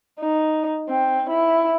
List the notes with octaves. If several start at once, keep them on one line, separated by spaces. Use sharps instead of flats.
D#4
C4
E4